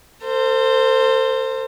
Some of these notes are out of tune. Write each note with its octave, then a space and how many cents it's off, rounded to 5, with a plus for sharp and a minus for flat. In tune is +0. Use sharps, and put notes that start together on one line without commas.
A4 +45 C5 +0